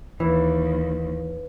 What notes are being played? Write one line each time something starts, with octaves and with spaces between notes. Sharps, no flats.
D#2 E3 B4